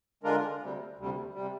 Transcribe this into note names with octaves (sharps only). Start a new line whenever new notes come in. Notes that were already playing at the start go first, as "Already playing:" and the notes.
D3 G#3 D4 F4 A#4
D2 C3 G3
D2 C3 G3
C3 G3